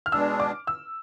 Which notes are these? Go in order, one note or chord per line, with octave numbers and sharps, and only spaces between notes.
F6
B2 G#3 D4 E6
D6
E6